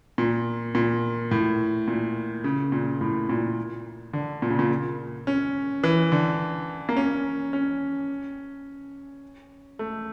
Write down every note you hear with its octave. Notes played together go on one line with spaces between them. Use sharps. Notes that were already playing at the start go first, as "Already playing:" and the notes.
A#2
A#2
A2
A#2
C#3
A#2
A2
A#2
D3
A#2
C#3
A#2
C#4
E3
D3
A#3
C#4
C#4
A3